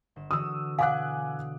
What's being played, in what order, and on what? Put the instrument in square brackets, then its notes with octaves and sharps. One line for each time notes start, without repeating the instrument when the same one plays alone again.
[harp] G1 E7
[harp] D3 E3 F#4 [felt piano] D#6 E6
[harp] B2 [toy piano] F5 F#5 [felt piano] G#5 D6 F#6